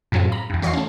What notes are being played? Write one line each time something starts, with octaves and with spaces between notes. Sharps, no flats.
F#2 A2 F#3 G#3 C4 F4
A#5 B5
E2 G2
E3 F#4 C#5 D#5 F5 C6
A3 C#4